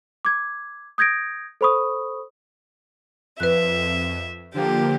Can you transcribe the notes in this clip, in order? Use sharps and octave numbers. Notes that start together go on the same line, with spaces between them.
D6 G#6
D#6 G6 G#6 A#6 D7
A4 C5 B5 C#6 D#6
F2 B4 E5 F#6
D3 F3 A#3 G4